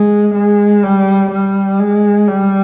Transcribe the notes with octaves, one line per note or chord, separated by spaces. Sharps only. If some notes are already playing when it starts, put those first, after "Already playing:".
Already playing: G#3
G#3
G3
G3
G#3
G3